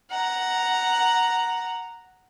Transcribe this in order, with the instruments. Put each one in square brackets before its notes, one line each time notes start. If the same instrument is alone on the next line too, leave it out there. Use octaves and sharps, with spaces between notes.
[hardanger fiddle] F#5 A#5